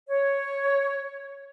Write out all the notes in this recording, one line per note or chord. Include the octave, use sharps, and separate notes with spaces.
C#5